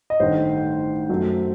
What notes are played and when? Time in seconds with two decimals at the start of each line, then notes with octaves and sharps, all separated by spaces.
0.10 D#5
0.20 A1 G2 D#3 A3 C5
1.09 F#2 F#3 A3